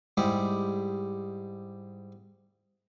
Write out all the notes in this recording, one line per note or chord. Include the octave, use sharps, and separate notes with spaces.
G#2 G3 G#3 E4 G4